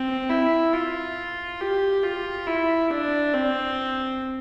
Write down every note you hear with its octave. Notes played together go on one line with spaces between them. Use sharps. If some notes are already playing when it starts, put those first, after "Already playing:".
Already playing: C4
E4
F4
G4
F4
E4
D4
C4